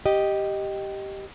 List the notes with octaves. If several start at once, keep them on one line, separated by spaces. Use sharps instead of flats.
G4 D#5